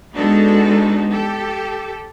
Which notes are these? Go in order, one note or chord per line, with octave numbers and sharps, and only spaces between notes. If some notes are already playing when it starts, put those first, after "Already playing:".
G#3 B3 D4 D#4 F#4 A4
G4 A4